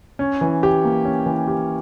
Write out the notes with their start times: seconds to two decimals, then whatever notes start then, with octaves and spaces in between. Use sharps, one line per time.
0.19 C#4
0.41 E3
0.63 G4
0.84 A#3
1.05 C#4
1.26 E3
1.48 G4